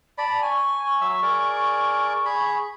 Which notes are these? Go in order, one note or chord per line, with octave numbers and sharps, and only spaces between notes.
D5 A5 B5
G#5 C#6
F#3 E5 E6
G#4 A#4 D5
G#4 B5